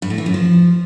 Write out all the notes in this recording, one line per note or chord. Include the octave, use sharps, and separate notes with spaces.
G2
A2
E3
F#2
F3